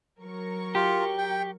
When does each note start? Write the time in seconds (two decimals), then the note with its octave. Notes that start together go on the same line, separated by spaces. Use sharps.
0.23 F#3 A#4 C#6
0.75 F4 G4
1.18 G5